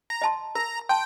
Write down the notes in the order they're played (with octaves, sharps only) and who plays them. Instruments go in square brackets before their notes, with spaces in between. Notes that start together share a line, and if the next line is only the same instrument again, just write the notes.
[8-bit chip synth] A#5
[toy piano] D#5 A5 C6
[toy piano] A#4 [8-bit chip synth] A#5
[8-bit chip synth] G5 [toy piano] A5 C6